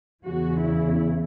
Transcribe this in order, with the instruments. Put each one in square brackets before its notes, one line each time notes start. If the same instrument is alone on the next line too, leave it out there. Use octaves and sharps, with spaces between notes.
[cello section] E2 C#3 E3 F#4
E4